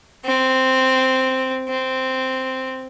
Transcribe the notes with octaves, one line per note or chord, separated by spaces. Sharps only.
C4
C4